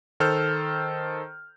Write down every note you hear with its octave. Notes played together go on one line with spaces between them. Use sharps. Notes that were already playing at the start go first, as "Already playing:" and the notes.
D#3 A4 C5 F6 G6